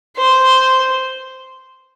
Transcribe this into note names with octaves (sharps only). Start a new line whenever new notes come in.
C5